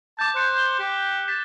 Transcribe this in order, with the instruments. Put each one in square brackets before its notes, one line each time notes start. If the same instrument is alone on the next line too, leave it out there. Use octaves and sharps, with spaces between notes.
[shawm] A5 [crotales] D6 G6
[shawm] C5 [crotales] F#6 C#7
[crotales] G7
[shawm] G4
[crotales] A6 B6 E7